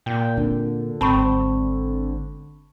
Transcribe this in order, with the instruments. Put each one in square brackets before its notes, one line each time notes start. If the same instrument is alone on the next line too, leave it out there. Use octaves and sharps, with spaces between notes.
[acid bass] A#2 [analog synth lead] G5
[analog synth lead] D3 [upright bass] C4
[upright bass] G#1 [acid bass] C4 [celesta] A5 B5 C#6